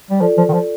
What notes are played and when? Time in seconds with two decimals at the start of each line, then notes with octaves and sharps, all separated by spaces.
0.11 G3
0.21 F3 F4 A4 D5
0.38 F3
0.49 D#3
0.53 F3